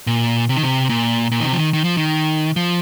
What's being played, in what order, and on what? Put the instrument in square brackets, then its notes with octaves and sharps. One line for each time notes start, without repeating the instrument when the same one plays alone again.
[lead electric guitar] A#2
C3
D#3
C3
A#2
A#2
D#3
C3
F3
D#3
D#3
F3
D#3
F3